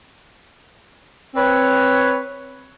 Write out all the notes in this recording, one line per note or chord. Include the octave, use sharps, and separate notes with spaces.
C4 B4 C#5